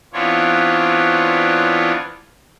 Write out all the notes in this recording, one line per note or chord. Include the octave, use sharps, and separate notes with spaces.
E3 B3 C4 D4 F4 C#5